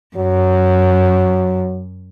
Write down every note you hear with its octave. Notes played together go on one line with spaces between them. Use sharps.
F#2 F#3